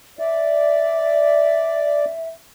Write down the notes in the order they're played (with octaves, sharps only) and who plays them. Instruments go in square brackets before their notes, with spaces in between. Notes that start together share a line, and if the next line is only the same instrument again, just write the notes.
[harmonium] D5 [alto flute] E5